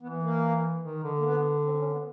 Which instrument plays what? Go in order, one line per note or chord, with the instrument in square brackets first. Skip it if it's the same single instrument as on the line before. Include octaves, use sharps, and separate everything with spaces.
[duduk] E3 [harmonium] B3
[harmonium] A#3
[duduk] D#3
D3
[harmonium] A#3
B3
C4
C#4
B3